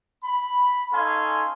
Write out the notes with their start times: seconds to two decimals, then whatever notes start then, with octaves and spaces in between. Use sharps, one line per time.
0.24 B5
0.92 C#4 D#4 A4 F5 G#5 C6